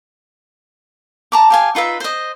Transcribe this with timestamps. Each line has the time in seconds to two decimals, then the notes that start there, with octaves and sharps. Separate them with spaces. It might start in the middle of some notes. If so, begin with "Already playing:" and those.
1.32 A5 A#5 D6
1.50 G4 F5 G#5
1.75 D#4 F4 B4 E5
2.00 C5 D#5